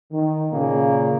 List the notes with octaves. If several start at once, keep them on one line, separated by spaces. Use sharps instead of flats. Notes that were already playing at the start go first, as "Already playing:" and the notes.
D#3
A#2 C#3 A#3